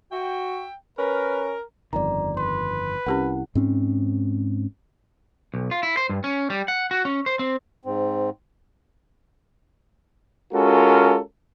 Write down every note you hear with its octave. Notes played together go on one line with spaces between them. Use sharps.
F#4 E5 G5
C#4 A#4 B4
G1 F2 D#3 D5 A#5
B4 C6
C2 C#4 E4 G4 A#4 F#5
G#2 C4 C#4
B1
F4
E4
C5
G2
C#4
G3
F#5
F#4
C#4
C5
C4
G#2 C4
G#3 C#4 F4 F#4 A4 A#4